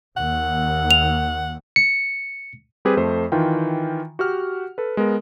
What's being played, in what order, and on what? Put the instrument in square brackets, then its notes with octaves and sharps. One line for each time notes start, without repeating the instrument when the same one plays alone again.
[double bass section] D#2 [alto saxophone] F#5
[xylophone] F7
[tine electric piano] C#7
[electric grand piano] G3 C4 G4 G#4 B4
F2 A3 C5
D#3 E3 F4 G5
F#4 G4 F#5 F6
A4 B4
G#3 B3 A#4